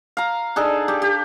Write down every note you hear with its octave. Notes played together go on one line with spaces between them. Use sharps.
F5 A#5
D4 D#4 G#4 A4
G4 D5
G4